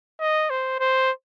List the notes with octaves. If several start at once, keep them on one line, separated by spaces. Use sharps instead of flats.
D#5
C5
C5